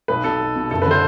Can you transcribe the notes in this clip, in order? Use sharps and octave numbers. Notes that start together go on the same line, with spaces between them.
B1 B4
B2 A4
B1
B2
F#1 A4
B4
D3 C5